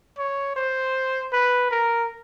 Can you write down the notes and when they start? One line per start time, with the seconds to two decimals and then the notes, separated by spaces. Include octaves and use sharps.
0.18 C#5
0.56 C5
1.33 B4
1.71 A#4